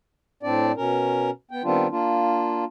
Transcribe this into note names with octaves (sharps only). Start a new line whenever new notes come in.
A2 C4 D4 D5
B2 C#4 A#4
B3 G5
D#3 G3 B3 C4 D4 F4
A#3 D4 F4